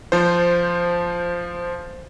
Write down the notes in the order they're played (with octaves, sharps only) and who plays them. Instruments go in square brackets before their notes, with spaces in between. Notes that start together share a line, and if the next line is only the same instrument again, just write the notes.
[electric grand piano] F3 F4 C5